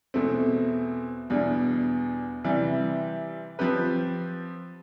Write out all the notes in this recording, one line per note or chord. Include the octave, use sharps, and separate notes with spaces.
E2 B2 A3 C4
E2 B2 G3 D4
C3 E3 G3
F3 C4 G4 B4